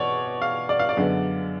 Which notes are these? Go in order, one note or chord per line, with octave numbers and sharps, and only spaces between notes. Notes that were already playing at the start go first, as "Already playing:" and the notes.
Already playing: B2 C#5 D5
F5
D5
F5
D5
F#2 D3 G#3 B3